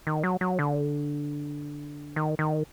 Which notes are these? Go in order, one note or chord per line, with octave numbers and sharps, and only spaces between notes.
D#3
F#3
F#3
D3
D#3
D#3